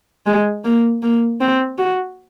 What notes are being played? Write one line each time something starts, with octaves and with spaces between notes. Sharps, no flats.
G#3
A#3
A#3
C4
F#4